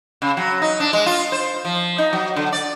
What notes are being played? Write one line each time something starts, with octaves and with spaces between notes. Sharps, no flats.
C#3
F#3
D#4
D4
G#3
F4
C5
F3
D#4
F#3
D3
D5